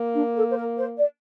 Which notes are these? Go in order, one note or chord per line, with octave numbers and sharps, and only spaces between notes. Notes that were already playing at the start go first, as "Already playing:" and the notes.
Already playing: A#3
D4
A4
C5
A#4
C5
D5